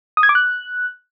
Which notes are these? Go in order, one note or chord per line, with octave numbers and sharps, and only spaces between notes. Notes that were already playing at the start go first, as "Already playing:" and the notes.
D#6
G#6
D6
F#6